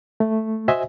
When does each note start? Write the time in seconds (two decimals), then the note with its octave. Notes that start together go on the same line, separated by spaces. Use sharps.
0.20 A3
0.68 F#4 C5 D#5 E5 G#5